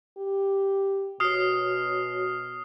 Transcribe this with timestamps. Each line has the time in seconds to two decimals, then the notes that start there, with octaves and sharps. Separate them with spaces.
0.18 G4
1.20 B2 F#4 C#5 D#6 F6 C7